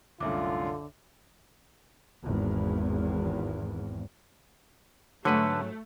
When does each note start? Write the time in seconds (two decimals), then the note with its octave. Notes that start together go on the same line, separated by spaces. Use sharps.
0.20 C2 F#2 A2 D3 F4 E5 D6
2.24 G#1 E2
5.25 G#2 D3 F#3 A3 B4